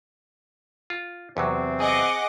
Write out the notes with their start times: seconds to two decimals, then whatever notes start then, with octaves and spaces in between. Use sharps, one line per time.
0.90 F4
1.37 E2 C3 F#3 C4
1.80 G#4 D#5 F#5 D6